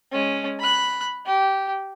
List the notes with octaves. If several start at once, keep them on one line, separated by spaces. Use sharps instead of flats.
G#3 C#4
B5 F#6
G4